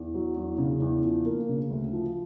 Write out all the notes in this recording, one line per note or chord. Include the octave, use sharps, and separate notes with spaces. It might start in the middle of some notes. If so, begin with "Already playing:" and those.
Already playing: E2
F#3
E2
C#3
E2
F3
A#3
C#3
D2
F3